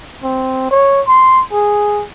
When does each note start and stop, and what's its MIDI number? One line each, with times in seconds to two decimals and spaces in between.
0.23 0.67 60
0.71 1.01 73
1.08 1.42 84
1.52 2.04 68